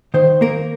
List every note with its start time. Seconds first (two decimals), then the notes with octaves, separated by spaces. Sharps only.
0.14 D#3 C5
0.41 A#3 A#4